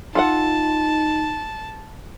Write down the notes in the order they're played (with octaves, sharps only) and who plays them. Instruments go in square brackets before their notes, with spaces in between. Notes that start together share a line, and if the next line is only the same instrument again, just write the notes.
[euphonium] D#4 [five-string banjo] F4 A4 F#5 [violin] A5